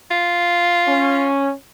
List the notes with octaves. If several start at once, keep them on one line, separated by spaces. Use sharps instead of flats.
F4
C#4